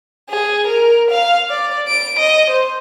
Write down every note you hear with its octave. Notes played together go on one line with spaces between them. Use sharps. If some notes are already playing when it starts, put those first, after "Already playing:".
G#4
A#4
F5
D5
D7
D#5
C5